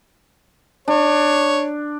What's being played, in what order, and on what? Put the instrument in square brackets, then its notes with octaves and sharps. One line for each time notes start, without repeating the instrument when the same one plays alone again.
[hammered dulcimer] D4 [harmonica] C#5